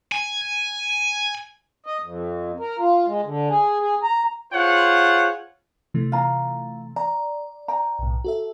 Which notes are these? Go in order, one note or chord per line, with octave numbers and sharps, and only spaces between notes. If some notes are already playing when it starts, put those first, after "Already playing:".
G#5
D#5
F2
A#4
F4
G#3
D3
G#4
G#4
A#5
F4 G#4 C5 C#5 F#5
C3 E3 A3
F4 A#5
D5 A#5
G5 A#5
B1 A2
F#4 A4 E5